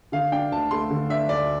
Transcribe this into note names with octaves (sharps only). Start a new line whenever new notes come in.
D3 F5
D4 G5
D2 A5
A3 C6
D3
D4 E5
D2 D5